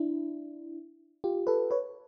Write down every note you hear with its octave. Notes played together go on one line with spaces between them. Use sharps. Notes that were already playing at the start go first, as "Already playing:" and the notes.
Already playing: D4 E4
F4 G4
A4 B4
B4 C#5